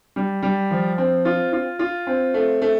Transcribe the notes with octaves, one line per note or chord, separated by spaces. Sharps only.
G3
G3
F3
C4
F4
F4
F4
C4
A3
A3